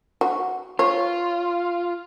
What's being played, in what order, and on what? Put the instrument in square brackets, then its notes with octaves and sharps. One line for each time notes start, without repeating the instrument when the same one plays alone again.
[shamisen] F#4
[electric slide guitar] F4 [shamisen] C#5